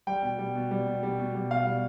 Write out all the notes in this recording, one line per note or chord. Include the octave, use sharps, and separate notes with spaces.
G3 G5
B2
G3
B2
G3
B2
G3
B2
G3
B2 F5
G3